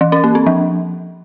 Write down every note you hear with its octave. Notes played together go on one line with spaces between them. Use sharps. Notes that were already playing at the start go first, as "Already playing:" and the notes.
E3
C#4
A#3
C4
F3